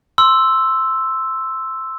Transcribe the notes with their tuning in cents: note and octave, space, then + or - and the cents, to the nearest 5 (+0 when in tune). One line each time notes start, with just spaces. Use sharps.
C6 +5 E6 +0